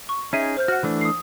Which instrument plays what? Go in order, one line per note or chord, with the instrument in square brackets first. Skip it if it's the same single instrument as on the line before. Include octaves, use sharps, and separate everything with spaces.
[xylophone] C#6
[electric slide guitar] C#4 D#4 G#4 [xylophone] E5 D#7
[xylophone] C5 F6 G6
[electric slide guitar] F#4 [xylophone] F#5 F6
[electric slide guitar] E3 A3 D4
[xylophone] D#6 C7